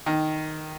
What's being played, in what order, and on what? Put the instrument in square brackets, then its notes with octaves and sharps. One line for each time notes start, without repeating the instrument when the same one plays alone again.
[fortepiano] D#3